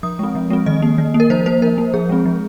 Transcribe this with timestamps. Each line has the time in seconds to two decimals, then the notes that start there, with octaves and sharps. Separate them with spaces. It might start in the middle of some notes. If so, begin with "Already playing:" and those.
0.03 F3 D#6
0.19 G#3 C4
0.35 F3
0.50 G#3 C4
0.66 D#3 D#5
0.82 A#3
0.98 D#3
1.14 A#3
1.20 A#4
1.30 F3 C5
1.46 A#3 C5
1.62 F3 A#4
1.78 A#3
1.94 F3 G#4
2.09 G#3 C4
2.25 F3